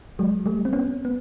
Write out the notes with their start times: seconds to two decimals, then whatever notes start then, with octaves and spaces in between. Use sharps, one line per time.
0.19 F#3 G#3
0.46 G3 A3
0.65 C4
0.73 B3 C#4
1.05 B3